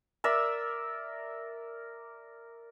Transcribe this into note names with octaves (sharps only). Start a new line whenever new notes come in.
A#4 D5 E5 E6